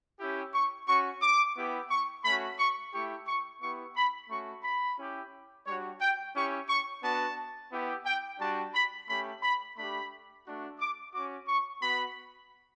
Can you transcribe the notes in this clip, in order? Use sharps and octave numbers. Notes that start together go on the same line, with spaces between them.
C#4 E4 G4
C#6
C#4 F#4 C#6
D6
B3 E4 G4
C#6
A3 C#4 F#4 B5
C#6
A3 E4 G4 C#6
C#6
B3 E4 G4 C#6
B5
A3 C#4 F#4 C#6
B5
C#4 E4 G4
G3 D4 F#4 C#5
G5
C#4 E4 G4 C#6
C#6
B3 D4 F#4 A5
B3 E4 G4
G5
G3 D4 F#4 A5
B5
A3 C#4 G4 B5
B5
A3 D4 G4 B5
A3 D4 F#4
D6
C#4 F#4 D6
C#6
B3 F#4 B5